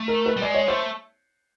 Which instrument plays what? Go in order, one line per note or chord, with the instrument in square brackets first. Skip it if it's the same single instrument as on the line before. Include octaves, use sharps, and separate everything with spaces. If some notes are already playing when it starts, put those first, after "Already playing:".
Already playing: [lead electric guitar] A3
[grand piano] A#4
B4
[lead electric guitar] G3
[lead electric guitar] G#3 [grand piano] D5
[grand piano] C#5
[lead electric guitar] A3 [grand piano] C5